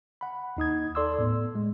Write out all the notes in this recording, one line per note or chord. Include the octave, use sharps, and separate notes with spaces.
F#5 B5
D#2 D#4 D#6 G#6
A4 D5 C6 D6 E6
A2 B3
G#3